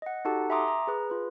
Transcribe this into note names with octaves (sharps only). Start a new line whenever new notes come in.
D#5 F#5
D#4 F#4 G4 A4 F#5 A5
E5 G#5 A#5 C6 D6 D#6
A#5
G#4 B4
F4 B4